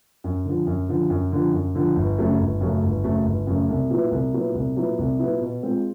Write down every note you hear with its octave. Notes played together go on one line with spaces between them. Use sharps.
F#2
D3 F3
F#2
D3 F3
F#2
D3 F3
F#2
D3 F3
G1
F#2 C#3 F#3 A3
G1
F#2 C#3 F#3 A3
G1
F#2 C#3 F#3 A3
G1
F#2 C#3 F#3 A3
C2
A#2 F#3 B3 E4
C2
A#2 F#3 B3 E4
C2
A#2 F#3 B3 E4
C2
A#2 F#3 B3 E4
B2
G#3 C4 F4